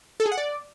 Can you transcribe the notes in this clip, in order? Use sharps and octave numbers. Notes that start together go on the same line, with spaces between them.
A4
G#4
F#5
D5